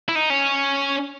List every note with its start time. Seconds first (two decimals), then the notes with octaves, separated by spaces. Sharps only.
0.09 E4
0.15 D#4
0.30 C#4